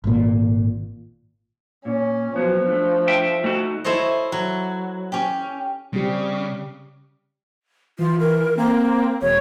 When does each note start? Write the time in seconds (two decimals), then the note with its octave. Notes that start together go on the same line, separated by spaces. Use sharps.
0.04 G#1 A#2
1.85 A#2 C#4
2.36 F3 F#3 B3
2.66 A3 D4
3.08 E5 G5
3.44 A3 D#4 F#4
3.84 E4 A4 C5 C#5 D#5
4.32 F#3
5.12 C#4 G4
5.93 C#3 G3 C4 G4
7.99 E3 F4
8.20 A#4
8.57 A#3 C4
9.22 E1 C#5